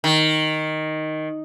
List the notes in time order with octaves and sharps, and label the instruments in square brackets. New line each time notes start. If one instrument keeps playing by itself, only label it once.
[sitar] D#3